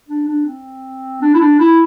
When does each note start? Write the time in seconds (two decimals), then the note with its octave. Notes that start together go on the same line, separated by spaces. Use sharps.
0.09 D4
0.28 D4
0.46 C4
1.22 D4
1.34 E4
1.41 D4
1.60 E4